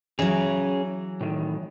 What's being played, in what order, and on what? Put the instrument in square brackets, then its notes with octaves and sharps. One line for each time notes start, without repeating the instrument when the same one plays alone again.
[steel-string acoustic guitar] E3 F#3 [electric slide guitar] C#4 G#4
[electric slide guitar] A2 D#3